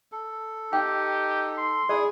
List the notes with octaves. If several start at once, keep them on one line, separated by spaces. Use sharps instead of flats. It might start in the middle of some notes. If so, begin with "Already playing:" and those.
A4
D#4 G4 G5
C6
E4 G#4 D5 D#6